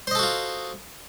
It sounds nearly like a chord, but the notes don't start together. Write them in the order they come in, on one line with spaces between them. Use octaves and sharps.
C5 D#5 A4 F#4 F4